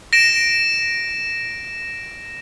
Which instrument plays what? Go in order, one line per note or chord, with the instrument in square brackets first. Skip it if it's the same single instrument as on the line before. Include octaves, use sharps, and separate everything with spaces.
[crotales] A#6 D7 E7